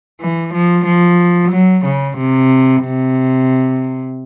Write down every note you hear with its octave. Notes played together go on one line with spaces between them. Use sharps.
E3
F3
F3
F#3
C#3
C3
C3